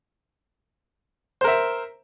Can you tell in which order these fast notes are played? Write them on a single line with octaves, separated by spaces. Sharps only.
C5 A#4 E5